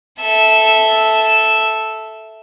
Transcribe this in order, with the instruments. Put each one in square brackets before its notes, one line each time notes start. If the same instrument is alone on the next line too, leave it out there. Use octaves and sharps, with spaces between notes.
[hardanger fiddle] A4 E5